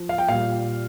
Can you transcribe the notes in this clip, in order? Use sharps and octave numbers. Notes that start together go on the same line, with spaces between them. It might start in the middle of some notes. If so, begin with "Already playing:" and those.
Already playing: F3
F5
G5
A#2 G3 F5